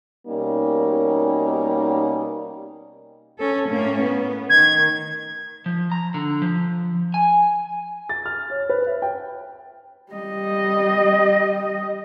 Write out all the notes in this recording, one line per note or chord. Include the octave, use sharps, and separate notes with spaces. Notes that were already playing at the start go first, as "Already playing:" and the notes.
B2 G3 A#3 C#4 D#4
C#4 A4
A2 A#3 C#4
B3
D#3 G#6
F3
A#5
D3
F3
G#5
A6
F6
C#5
B4
E5
G5
G3 D#5